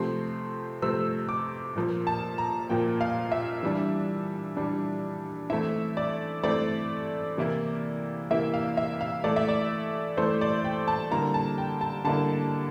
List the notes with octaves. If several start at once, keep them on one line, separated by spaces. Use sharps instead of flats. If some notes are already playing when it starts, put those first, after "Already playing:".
Already playing: C3 F3 A3 C4 C6
C3 F3 A3 C4 E6
D6
A#2 F3 A#3
A5
A#5
A#2 F3 A#3 G5
F5
E5
E3 G3 D4
E3 G3 D4
E3 A3 C4 E4 E5
D5
E3 A3 C4 E4 D5
C3 E3 A#3 E4
C3 E3 A#3 E4 E5
F5
E5
F5
E3 A3 E4 D5
E5
D5
E3 A3 E4 C5
D5
G5
A5
D3 G3 A#3 E4 A#5
A5
G5
A5
D3 G3 A#3 E4 A5